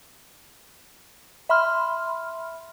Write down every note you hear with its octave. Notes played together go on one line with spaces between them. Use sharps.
E5 B5 C6 F6